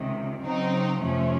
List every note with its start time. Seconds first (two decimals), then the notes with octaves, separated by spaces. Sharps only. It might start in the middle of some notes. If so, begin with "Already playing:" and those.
Already playing: C#2 C3 D#3
0.42 C#3 F#3 C4 D#4
1.00 F2 C3 F3 A3 C#4